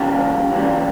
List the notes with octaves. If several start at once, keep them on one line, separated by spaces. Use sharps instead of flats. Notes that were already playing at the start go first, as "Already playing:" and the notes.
Already playing: F#2 C#3 E3 G3 F4 G4
F#2 C#3 E3 G3